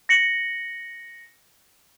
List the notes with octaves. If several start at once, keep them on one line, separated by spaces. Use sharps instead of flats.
A#6 C#7 F#7